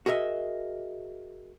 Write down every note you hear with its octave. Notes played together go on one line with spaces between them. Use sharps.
F#4 G#4 A#4 D#5 E5